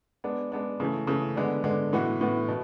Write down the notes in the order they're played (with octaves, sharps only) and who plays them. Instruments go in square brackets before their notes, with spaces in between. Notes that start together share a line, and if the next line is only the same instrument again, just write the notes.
[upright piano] G#3 B3 D4
G#3 B3 D4
C#3 E3 A3
C#3 E3 A3
D3 G#3 B3 D4
D3 G#3 B3 D4
A2 E3 B3 F#4
A2 E3 B3 F#4
B2